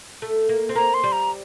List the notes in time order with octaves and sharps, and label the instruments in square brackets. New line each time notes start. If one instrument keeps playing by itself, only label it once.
[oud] A3
A#3
C4
[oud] A#3 [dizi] A#5
[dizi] C6
[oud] G3
[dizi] A#5